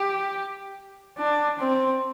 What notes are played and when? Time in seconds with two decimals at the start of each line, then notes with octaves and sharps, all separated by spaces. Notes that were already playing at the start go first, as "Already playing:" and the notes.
Already playing: G4
1.18 D4
1.59 C4